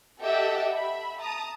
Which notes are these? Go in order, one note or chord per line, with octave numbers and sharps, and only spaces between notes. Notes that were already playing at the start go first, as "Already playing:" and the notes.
G4 A4 D#5 E5 F#5 G5
E5 B5
A5 A#5 D#6